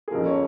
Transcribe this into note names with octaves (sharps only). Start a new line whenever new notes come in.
G#4
F2 C#3 F3 A#4
C#5